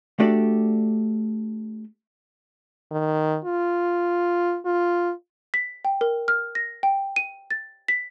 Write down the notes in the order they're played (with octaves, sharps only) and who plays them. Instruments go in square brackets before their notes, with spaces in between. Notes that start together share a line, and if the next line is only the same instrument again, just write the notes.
[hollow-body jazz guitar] A3 D4 F#4 G4 A4 D5
[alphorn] D#3
F4
F4
[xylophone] B6
G5
A#4
F6
A#6
G5
D#7
A6
B6